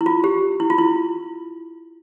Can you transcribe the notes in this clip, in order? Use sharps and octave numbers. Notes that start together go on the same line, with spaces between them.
E4
F4
G4
E4
F4
E4